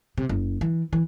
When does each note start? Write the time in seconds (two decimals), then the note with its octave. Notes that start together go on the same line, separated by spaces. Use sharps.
0.18 C3
0.29 F#1
0.61 E3
0.93 E3